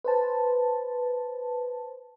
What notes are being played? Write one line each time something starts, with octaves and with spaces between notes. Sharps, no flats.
B4 C5 A5